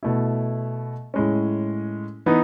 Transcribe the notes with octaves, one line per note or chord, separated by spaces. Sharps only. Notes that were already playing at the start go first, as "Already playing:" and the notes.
B2 A3 E4
A2 G#3 C#4
E3 B3 D#4